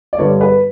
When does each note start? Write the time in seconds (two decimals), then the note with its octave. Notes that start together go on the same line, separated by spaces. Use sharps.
0.13 D5
0.18 G2 D3 G3 B3 C#5
0.41 B4